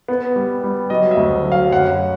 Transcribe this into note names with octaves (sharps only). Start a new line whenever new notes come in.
B3
G3
G3
F#3 D#5
E5
D2
F#3
F5
F#2 F#5